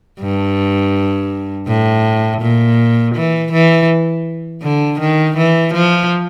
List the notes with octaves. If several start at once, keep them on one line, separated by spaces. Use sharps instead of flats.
G2
A2
A#2
E3
E3
D3
D#3
E3
F3